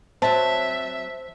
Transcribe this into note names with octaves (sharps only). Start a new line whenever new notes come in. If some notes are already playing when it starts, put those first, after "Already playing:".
F#3 C4 C5 E5 A5